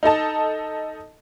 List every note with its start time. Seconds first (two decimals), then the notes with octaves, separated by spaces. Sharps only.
0.03 D#4 A4 D#5 A5